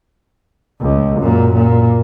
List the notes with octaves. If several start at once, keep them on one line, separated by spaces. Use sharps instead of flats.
C#2
F#2 A#2
A#2